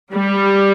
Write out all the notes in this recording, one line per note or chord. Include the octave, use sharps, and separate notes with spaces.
G3